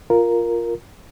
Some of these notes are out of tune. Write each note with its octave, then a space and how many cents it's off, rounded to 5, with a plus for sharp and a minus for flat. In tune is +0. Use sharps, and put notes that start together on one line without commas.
F4 +0 A#4 +0